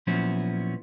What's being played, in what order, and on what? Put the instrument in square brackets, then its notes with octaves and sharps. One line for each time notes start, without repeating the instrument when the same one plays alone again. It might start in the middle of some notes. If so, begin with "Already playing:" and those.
[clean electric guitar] A#2 F3 F#3 B3 C#4 E4